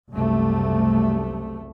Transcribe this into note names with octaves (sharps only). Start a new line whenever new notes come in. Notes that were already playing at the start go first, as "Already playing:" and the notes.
F#1 C2 A3